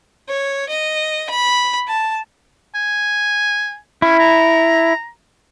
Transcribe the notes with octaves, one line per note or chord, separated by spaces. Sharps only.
C#5
D#5
B5
A5
G#5
C#4 E4
A#5